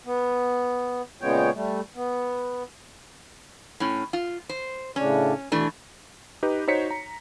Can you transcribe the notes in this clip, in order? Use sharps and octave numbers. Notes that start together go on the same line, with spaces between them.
B3
A#2 C#3 G#3 B3 C#5 G5
G3 A3
B3
A2 C#4
F4
C5
A2 C#3 C#4 D4
B2 E3 A3 D4
D#4 G4 B4
D#4 F#4 C5 C#5 B6 C#7
A#5